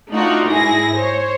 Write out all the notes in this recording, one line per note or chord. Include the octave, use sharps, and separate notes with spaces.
A3 D4 D#4 F4 F#4
G#2 E4 G#4 A#6
C5 C#5